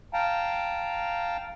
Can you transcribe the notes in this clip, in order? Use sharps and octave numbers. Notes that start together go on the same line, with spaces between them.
F5 G5 A5 A#5